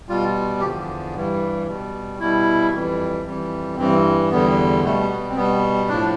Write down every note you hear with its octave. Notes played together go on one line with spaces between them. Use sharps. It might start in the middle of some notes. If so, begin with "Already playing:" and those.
B2 G3 F4
E2 D3 F3 G4
G2 E3 G3
B2 G3
B2 G3 E4
F2 E3 G3
F2 E3 G3
G2 E3 G3 C4
E2 D3 G3 B3
B2 G3 A3
B3
C4
B2 G3 B3
A2 F3 D4